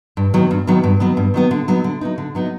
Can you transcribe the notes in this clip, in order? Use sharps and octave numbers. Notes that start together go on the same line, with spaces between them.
G2
D#3 F#3 B3
G2
D#3 F#3 B3
G2
D#3 F#3 B3
G2
D#3 F#3 B3
D3
F#3 B3 D#4
D3
F#3 B3 D#4
D3
F#3 B3 D#4